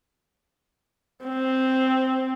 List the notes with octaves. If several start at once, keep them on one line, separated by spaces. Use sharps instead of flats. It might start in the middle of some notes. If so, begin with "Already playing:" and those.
C4